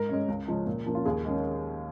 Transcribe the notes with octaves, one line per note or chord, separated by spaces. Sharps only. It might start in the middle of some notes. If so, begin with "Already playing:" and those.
Already playing: G#2 A#4
G#3 C#4
C#2
C#3 F3 G#3 C#4
A#2
F3 A#3 C#4
F4
D#2 G#4
D#3 G#3 C#4